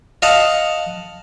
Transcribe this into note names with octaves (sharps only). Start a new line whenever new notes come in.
D#5 F5 F#5 A5